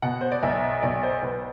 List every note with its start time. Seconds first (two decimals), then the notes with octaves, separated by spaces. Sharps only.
0.02 B2 F#5
0.21 C5
0.32 D5
0.42 B1 E5
0.82 B1 D5
1.03 C5
1.22 B1 B4